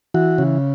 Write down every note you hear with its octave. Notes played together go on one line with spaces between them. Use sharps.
E3 F#4
C#3